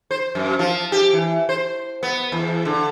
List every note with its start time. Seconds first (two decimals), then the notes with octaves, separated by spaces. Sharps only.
0.11 C5
0.35 F#2
0.59 F3
0.92 G4
1.13 E3
1.49 C5
2.03 B3
2.32 E2
2.65 D3